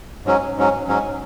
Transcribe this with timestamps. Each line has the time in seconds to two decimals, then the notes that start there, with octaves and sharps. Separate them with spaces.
0.25 G#2 F#3 C#4
0.57 G#2 F#3 C#4
0.88 G#2 F#3 C#4